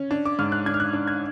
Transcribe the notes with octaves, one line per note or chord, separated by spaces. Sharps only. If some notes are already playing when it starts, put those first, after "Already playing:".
Already playing: C#4
D4
D6
G#2 F6
F#6
D4 G#6
F6
F#6
D4
G#6